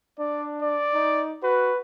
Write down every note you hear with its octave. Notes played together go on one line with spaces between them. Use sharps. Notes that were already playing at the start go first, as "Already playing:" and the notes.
D4 D5
D5
D#4
F#4 B4